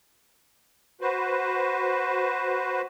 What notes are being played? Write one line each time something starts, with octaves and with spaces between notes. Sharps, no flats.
F#4 B4 C5